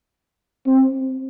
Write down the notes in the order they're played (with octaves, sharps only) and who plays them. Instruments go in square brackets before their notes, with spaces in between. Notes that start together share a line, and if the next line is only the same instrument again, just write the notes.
[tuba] C4